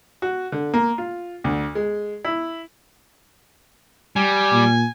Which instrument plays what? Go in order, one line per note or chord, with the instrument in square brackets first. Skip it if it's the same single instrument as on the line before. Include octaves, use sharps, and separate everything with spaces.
[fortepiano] F#4
D3
A#3
F4
D2
G#3
E4
[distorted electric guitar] G3 [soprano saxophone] G#5
[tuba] A#2